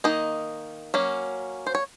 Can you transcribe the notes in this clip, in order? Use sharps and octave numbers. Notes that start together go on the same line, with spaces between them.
D#3 A#3 D#4 D#5
F#3 A#3 C#4
C5
C#5